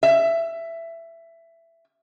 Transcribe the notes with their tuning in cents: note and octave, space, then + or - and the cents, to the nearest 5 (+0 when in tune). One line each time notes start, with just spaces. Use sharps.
E5 +15